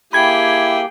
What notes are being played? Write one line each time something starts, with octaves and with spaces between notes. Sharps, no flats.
A#3 E4 G4 G#4 G5 B5 G#6